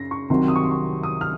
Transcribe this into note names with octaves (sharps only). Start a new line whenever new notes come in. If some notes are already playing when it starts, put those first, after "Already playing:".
Already playing: F#2 C#3 A#6 C7
C#6
C2 C3 D#3 F#3 C6
D#6
C#6
C6
C#6
D#6
F6